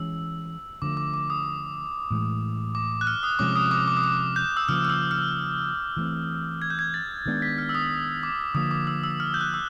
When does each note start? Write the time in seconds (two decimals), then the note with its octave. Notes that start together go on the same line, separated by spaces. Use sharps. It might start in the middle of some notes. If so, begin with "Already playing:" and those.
Already playing: E3 G#3 C#4 E6
0.82 D3 F3 A3 D6
0.97 D6
1.14 D6
1.30 D#6
2.11 A2 E3 G#3
2.75 D6
3.01 F#6
3.07 F6
3.23 D#6
3.39 C3 F3 G#3 C#4 D6
3.56 D#6
3.71 D6
3.88 D6
3.97 D#6
4.04 D6
4.36 G6
4.57 E6
4.68 C#3 F3 A#3 F6
4.85 F6
4.90 E6
5.11 F6
5.97 E3 A3 C4
6.62 G#6
6.70 G6
6.79 G#6
6.94 A6
7.26 D#3 G#3 B3 D4
7.42 B6
7.58 F6
7.69 E6
7.75 D#6
8.23 D6
8.55 D3 F3 A#3 D#6
8.71 D6
8.87 E6
9.04 E6
9.20 F6
9.34 G6
9.41 F#6
9.54 E6